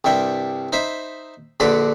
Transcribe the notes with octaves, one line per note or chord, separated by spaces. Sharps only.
C2 G2 E5 G5
D#4 C5 E5 B5
A#1 D3 F#4 B4 D5 B5